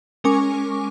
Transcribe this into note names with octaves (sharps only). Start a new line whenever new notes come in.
G#3 C#4 A#4 G#5 C#6 D6